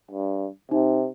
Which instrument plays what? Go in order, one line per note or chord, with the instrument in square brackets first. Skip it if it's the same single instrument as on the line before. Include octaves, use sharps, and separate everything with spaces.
[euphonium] G2
[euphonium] C3 [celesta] D#4